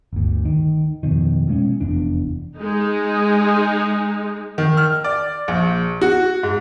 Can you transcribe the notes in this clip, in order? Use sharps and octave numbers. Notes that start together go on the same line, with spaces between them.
G1 D2
D#3
F2 B2 D#3
B2 G#3 A#3 C#4
F1 E2 D4
G#3 D#4
D#3
F6
D5
A#1
F#4
G#2